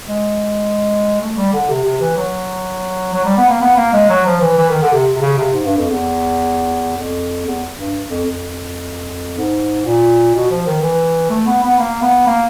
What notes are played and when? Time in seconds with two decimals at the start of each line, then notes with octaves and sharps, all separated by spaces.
0.08 G#3
1.21 A3
1.37 G3
1.53 D3
1.69 C3
1.85 C3
2.01 E3
2.17 F#3
3.13 F#3
3.25 G3
3.37 B3
3.49 A#3
3.61 B3
3.77 A#3
3.93 G#3
4.10 F#3
4.26 F3
4.41 E3
4.58 E3
4.69 D#3
4.82 D3
4.93 C3
5.16 C3
5.21 C#3
5.38 C3
5.54 G#2
5.65 G2
5.78 F2
5.90 E2
6.97 F2
7.46 E2
7.78 G2
8.10 F2
8.26 F2
9.38 G#2
9.86 A#2
10.35 B2
10.51 F3
10.67 D#3
10.82 E3
11.30 A3
11.46 B3
11.63 B3
11.79 A#3
12.02 B3
12.27 A#3